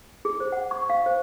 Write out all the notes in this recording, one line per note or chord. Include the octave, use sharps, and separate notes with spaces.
G#4
C5
F#5
C#6
F5
C5